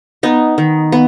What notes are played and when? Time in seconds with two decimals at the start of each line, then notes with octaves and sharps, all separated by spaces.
0.23 B3 D#4
0.58 D#3
0.92 B3